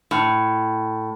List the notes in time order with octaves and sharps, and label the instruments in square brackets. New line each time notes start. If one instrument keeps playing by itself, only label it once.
[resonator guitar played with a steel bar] A2